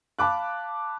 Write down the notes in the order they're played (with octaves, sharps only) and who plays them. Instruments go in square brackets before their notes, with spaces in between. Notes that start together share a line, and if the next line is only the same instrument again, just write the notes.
[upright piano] F5 A5 B5 D6 F#6